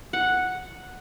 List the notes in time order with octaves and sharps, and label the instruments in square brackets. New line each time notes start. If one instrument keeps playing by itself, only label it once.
[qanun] F#5